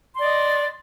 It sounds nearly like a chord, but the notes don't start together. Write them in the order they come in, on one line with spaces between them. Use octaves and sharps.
C6 D5 D#5